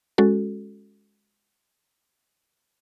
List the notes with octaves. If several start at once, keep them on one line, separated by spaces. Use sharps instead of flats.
G#3 C#4 F#4 A4